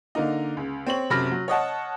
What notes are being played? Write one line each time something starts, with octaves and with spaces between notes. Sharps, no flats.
D3 A#3 D#4
C#2
C4 C#5 F#7
F#1 C3 F#3 B5 F6 A#6
F#3
C#5 D#5 F#5 A5